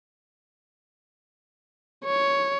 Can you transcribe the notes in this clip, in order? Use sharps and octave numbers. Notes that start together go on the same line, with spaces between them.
C#5